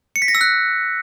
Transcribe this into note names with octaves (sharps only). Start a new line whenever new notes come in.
C#7
B6
A#6
E6
F#6